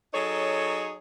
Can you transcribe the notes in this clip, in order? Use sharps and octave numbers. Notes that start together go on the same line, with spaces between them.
F#3 D#4 G#4 A4 C#5